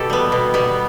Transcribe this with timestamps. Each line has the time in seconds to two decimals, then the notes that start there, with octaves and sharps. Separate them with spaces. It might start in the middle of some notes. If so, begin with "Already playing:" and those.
Already playing: B2 G4 A4
0.10 G3 B3
0.32 B2
0.54 G3 B3